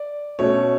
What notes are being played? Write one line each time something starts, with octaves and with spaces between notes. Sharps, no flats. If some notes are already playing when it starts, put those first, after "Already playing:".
Already playing: D5
B2 A3 C#4 C#5